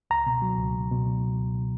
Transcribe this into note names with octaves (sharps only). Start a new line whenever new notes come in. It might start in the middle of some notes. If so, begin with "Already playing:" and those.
C#2 A#5
B2
F#3
C#2
C#2
B2
F#3
C#2
C#2
B2